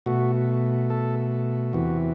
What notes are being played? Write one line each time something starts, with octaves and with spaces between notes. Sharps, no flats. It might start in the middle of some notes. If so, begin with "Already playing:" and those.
B2 A3 F#4
A4
E2 C3 E3 F#4